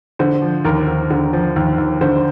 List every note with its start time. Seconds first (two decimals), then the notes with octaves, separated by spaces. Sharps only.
0.19 D3 C5
0.42 F3
0.65 D#2 A#4
0.88 D#2
1.11 D3
1.33 F3
1.56 D#2
1.78 D#2
2.01 D3 C5